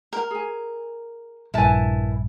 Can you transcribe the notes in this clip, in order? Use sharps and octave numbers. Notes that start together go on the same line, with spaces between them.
A#4
G#4 G#5
A#1 G2 E4 A#4 B4 G#5 A5